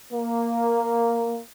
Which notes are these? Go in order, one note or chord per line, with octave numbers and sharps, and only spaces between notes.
A#3